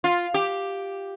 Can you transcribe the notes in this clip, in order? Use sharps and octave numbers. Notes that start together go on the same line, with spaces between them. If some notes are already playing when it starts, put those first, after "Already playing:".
F4
G4